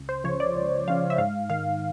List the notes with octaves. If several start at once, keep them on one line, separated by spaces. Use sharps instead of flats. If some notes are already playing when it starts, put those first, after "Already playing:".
Already playing: C#2
C5
C#3 F3 C#5
D5
C#2
C#3 F3 F5
E5
G#2 F5
D#3 F5